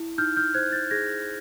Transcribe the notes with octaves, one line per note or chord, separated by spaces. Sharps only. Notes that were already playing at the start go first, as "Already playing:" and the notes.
Already playing: E4
D#4 F6 G6
F6 G6
C5 F#6 G#6
G6 A6
G#4 G#6 A#6